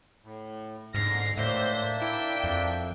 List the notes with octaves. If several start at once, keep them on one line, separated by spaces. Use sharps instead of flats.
A2
G#2 D3 F6 A#6 C7
A2 A#3 D4 C5 E5
E4 G5
F2